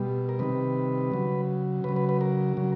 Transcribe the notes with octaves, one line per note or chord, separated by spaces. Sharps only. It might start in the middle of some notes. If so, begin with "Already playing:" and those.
Already playing: B2 G3
A#4
C3 D#3 G3 B4
C#3 F#3
C#3 F#3 B4
B4
B4
A#4
C#3 F#3